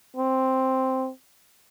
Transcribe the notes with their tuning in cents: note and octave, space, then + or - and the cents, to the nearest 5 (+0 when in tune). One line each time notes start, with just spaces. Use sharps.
C4 +0